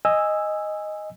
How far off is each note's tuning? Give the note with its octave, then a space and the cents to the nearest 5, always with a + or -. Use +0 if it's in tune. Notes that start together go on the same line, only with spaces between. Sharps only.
D#5 +0 G#5 -15 E6 +0